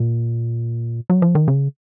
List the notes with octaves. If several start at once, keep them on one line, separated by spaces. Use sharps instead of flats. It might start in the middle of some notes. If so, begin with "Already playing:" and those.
Already playing: A#2
F#3
F3
D#3
C#3